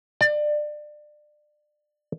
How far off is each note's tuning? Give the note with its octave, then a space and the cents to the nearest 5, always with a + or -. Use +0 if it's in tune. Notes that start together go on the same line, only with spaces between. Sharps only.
D5 +25